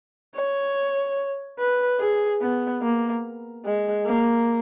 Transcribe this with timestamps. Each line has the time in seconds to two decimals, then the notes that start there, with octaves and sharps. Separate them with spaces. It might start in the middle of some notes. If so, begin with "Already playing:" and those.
0.35 C#5
1.59 B4
1.99 G#4
2.41 B3
2.82 A#3
3.65 G#3
4.06 A#3